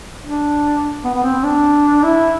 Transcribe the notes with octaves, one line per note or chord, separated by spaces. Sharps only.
D4
B3
B3
C4
D4
E4